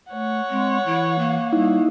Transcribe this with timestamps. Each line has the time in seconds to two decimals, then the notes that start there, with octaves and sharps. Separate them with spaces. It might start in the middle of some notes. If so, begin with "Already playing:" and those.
0.11 A3 C#5 F#5
0.50 G#3 C4
0.86 E3 E4
1.19 A#3
1.53 G3 D#4 E4